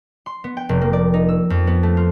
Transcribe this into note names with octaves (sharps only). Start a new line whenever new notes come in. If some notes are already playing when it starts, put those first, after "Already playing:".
C6
B3
G5
F1
A#3
D5
D#4
E6
F2
B3
A3
F4